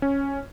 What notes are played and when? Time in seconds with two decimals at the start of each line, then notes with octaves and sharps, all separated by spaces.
0.02 C#4